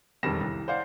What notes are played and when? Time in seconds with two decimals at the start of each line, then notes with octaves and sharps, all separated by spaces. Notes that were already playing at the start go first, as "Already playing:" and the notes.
0.23 E1 F2 D#3 G3 A#6 E7
0.40 C2
0.68 C5 D5 F5 F#5